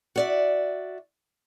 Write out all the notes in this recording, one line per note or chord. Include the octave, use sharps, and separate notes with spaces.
F#4 D5 E5